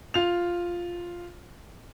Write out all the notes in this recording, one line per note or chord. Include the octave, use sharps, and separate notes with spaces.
F4 F7